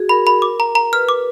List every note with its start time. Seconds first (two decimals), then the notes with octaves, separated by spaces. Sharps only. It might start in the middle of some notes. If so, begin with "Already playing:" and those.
Already playing: F#4 G#4
0.09 A#4 B5
0.26 A#4 B5
0.42 D6
0.60 A#5
0.75 A#5
0.92 B4 F6
1.09 D6